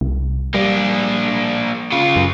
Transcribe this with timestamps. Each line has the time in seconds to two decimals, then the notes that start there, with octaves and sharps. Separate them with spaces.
0.01 C2
0.54 G3 A#3 D4
1.92 C#3 F4
2.16 F#2